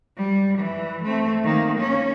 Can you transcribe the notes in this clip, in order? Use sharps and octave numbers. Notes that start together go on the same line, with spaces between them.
G3
E3
A3 C4
D#3 A#3
A#3 C#4